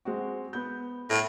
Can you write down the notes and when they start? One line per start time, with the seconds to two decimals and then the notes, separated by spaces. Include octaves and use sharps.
0.05 G#3 C4 F#4
0.53 B3 G6
1.10 A2